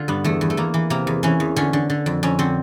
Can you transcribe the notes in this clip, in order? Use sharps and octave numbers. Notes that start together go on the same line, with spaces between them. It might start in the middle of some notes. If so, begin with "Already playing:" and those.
Already playing: D3 F4
G2 B3
E2 A3
E2
A3
E2 A#3
E3
C3 A#3
E2
E3 C#4
E2
D3 C#4
D3
D3
F2
F2 C#4
D3 C4